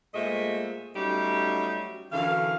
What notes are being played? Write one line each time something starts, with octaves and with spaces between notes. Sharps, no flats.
A#2 G#3 A3 C5 D#5 E5
F#3 G3 A3 C#4 D#4 G4
F#2 D3 E3 F5